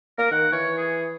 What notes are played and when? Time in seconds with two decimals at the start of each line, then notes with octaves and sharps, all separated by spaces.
0.18 A#3 A#4
0.31 D#3 F#5
0.52 E3 C#5
0.78 G#4